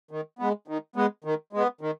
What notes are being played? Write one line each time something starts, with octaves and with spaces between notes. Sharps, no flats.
D#3
G#3 B3
D#3
G#3 B3
D#3
G#3 B3
D#3